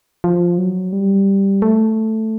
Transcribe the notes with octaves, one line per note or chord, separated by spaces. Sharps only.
F3
F#3
G3
A3